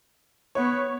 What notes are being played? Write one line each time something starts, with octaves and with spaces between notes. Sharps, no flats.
B3 C#5